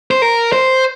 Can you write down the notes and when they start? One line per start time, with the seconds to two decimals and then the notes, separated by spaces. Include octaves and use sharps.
0.11 C5
0.22 A#4
0.52 C5